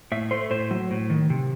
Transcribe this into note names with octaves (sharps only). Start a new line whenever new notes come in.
A2 E5
A3 C5
A2 C5
F#3
A2
D#3
C3